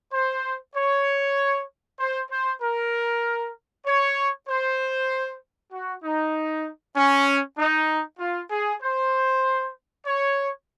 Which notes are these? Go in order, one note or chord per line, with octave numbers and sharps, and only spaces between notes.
C5
C#5
C5
C5
A#4
C#5
C5
F#4
D#4
C#4
D#4
F4
G#4
C5
C#5